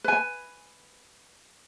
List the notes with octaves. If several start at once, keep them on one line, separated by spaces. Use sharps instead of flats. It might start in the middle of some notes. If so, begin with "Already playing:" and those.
B4 G#5